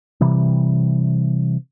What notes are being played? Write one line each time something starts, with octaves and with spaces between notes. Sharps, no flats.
C3 E3 G3